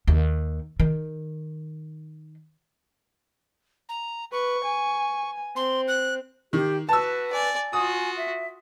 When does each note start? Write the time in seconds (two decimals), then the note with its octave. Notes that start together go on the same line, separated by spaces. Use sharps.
0.08 D#2
0.80 D#3
3.89 A#5
4.32 B4 C#6
4.65 G#5
5.56 C4 C6
5.88 F#6
6.53 D#3 G4
6.89 F#4 B4 A5 E6
7.33 D5 G#5
7.73 F4 F#4 G#5 D#6
8.17 E5